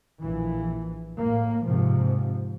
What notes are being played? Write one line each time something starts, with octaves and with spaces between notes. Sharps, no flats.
A#1 E3
A2 A#3
G#2 C3 F3